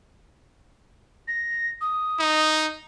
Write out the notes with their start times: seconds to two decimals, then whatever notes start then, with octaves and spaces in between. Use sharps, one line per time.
1.28 A#6
1.81 D#6
2.19 D#4